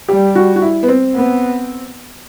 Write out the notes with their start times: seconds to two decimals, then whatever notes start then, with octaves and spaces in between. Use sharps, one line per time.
0.09 G3 G4
0.35 F#4
0.56 F#4
0.62 E4
0.83 B3
0.88 C4
1.15 B3